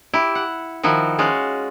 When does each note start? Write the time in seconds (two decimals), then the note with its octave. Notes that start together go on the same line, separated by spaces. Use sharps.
0.14 E4 G4
0.35 F#5
0.83 D#3 F3 E4 F#4
1.19 G#3 C#4 F4 F#4